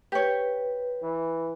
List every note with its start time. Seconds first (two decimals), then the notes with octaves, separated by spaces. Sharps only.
0.12 G4 B4 C#5
1.03 E3